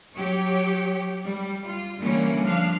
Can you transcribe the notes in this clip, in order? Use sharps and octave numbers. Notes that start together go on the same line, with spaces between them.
F#3 G4 C#5
G3
F4
D3 E3 G3 A#3 C#4
F3 D4 F5